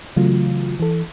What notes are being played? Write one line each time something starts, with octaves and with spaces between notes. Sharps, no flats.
C#3 E3 F#3 A3 F4
E3 A4